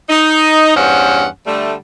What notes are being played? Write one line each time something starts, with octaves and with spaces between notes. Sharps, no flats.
D#4
E2 G2 C#4 C5 F#5
D3 G3 A3